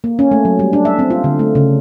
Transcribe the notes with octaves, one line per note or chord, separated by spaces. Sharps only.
A#3
C#4
A3
F#3
G3
D4
E5
C4
F4
D3
A3
C#3